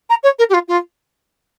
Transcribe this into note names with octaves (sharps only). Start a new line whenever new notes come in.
A#5
C#5
A#4
G4
F4
F4